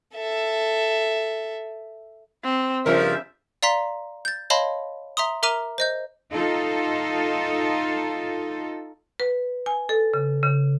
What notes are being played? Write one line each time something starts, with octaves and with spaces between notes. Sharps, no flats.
A4 E5
C4
G2 C#3 F3 A#4 E5
D5 F5 A#5 C6 B6
G6 A6
C#5 D#5 F5 A5 B5 C6
E5 A#5 C6 D#6
A#4 E5 A#5 D6 F6 D#7
C5 D#5 G6
D#4 F4 A4
B4
G#5
A4
C#3
C#3